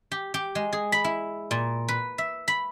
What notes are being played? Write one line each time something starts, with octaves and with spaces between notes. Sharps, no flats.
G4
G4
G#3
G#4
B5
E4
A#2
B4
E5
B5